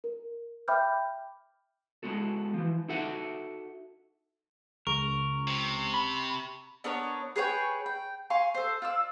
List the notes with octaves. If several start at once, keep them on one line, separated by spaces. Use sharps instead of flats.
A#4
E5 G5 B5 D6 F6 G6
G#3 B3 F#4 A4
E3 F3
D#4 F#4 A4 E5 F#5
C#2 A#4 C#6
C3
B5
B3 D4 A#4 C#5
G#4 B4 C#5 G5
G5
F5 G#5 C6 C#6
A4 C5
F4 D5 E6